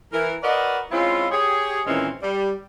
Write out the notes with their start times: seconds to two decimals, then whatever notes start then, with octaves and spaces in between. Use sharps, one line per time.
0.13 E3 A#4
0.43 F#4 A#4 B4 D5 D#5
0.91 G#3 C4 C#4 E4 F4
1.31 G4 G#4 C#5
1.87 A#2 D#3 E3 G#3 C4 C#4
2.22 G3